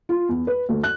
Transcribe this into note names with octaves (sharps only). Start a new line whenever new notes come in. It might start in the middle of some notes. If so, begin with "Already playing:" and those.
F4
E2
B4
D2
F#6